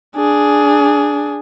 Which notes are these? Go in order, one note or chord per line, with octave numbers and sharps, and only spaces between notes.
D4 G#4